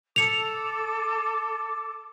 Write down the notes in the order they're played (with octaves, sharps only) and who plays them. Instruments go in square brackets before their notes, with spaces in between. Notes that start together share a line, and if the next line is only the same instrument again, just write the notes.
[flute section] A4 D6 [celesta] C#7 F7